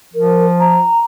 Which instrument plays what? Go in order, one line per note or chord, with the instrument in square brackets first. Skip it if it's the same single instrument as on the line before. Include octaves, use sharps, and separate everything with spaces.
[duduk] F3 [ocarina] A#4
[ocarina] A#5